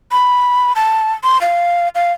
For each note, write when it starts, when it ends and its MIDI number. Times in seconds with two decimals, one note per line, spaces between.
0.12 0.73 83
0.76 1.13 81
1.24 1.40 84
1.41 1.89 77
1.95 2.13 77